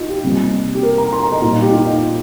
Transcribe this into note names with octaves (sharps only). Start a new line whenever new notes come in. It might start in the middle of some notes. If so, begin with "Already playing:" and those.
Already playing: D#4 F4
G4
C3 G3 A#3
G4
A#4
A#5
C6
A#5
D#5
A#2 G3 A#3 F4
D#4
G4
F4
D#4